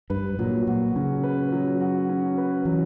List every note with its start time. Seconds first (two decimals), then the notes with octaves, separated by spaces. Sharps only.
0.10 G2 B4
0.39 A#2 F#3
0.67 A#2 F#4
0.96 C#3 C#4
1.23 B4
1.52 F#3
1.81 F#4
2.09 C#4
2.37 B4
2.65 E3 F#3